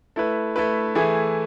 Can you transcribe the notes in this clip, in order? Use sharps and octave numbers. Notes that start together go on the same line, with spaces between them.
A3 E4 B4
A3 E4 B4
E3 A3 E4 G#4